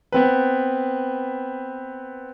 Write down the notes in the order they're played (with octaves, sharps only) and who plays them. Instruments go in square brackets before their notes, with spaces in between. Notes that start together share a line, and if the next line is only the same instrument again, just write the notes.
[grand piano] B3 C4 B4